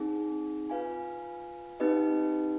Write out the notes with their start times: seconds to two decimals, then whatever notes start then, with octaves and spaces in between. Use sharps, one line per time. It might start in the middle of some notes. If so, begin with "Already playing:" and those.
Already playing: C4 D#4 G#4
0.70 F4 B4 F5 G#5
1.80 C4 D#4 G4 B4 D#5